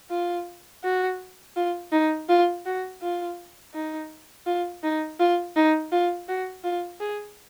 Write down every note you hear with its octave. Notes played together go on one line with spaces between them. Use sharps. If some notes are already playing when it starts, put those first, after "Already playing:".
F4
F#4
F4
D#4
F4
F#4
F4
D#4
F4
D#4
F4
D#4
F4
F#4
F4
G#4